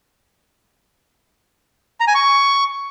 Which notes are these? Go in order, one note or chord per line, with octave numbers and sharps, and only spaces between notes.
A#5
G#5
C#6